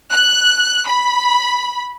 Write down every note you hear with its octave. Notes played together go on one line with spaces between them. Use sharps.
F#6
B5